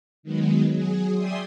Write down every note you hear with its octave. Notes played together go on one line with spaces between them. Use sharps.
D#3 F#3 G#3 B3
F#3 G#4
D5 E5 G5 G#5 C6 D#6